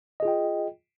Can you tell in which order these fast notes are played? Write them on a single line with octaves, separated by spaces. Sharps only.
D#5 G#4 F4 G5